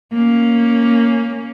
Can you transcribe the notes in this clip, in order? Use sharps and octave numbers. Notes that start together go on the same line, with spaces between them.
A#3 C#4